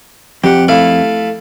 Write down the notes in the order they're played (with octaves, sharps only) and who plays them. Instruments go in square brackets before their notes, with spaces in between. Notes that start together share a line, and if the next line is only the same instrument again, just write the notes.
[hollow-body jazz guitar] F2 [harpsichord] G4 F#5
[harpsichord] A3 E4 F5